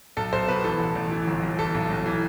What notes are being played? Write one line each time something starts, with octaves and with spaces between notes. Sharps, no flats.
B1 A4
B1 C5
B2 B4
E3 A4
A1
A1
E3
G1
G1
E3 A4
B1
B1
E3